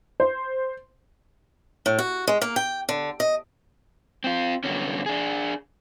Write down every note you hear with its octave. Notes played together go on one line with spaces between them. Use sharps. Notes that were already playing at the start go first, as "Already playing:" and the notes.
C5
A2
F#4
G#3
A#3
G5
D3
D#5
C4 F4
G2 A#2 D3 F#3 B3 C#4
D4 G#4